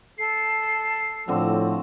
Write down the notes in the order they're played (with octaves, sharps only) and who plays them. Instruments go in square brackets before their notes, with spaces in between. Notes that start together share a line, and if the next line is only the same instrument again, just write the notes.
[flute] A4 [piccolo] C7
[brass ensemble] A2 F3 [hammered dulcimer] D3 C4 F#4